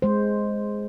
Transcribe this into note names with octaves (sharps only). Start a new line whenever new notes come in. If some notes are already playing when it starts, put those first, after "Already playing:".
G#3 C5